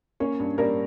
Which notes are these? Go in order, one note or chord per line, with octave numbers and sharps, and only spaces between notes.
A#3 C#4 C#5
G2
G3 A#3 A#4